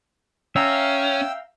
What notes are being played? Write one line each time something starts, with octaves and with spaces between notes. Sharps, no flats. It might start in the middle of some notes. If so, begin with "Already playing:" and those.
C#4 E5 F5 G5 A#5 E6